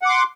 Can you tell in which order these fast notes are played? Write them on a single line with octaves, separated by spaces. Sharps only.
F#5 D6 C6